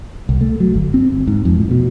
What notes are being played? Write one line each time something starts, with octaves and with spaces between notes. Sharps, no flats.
C2
A3
F#3
G1
C4
G1
G#2
F2
A2
B2